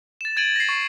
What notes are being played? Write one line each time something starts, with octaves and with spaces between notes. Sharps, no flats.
A6 E7
G#6 A6 D7 D#7 F#7
A#6 C7
C#6